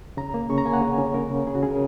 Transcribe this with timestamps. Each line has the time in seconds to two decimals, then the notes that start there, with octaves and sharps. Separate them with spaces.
0.17 C#3 A#5
0.34 A#3
0.49 C#3 C#6
0.58 A#5
0.65 A#3 G#5
0.73 F#5
0.82 C#3 C#5
0.99 C#3
1.14 C#3 A#4
1.30 C#3
1.47 C#3 G#4
1.55 F#4
1.63 C#3 G#4
1.71 A#4